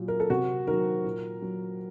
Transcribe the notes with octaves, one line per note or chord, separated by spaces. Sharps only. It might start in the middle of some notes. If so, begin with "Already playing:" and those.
Already playing: A#2 F#3
A#4
A4
C3 F#4
D#3 F#3 A#4
A#2
F#3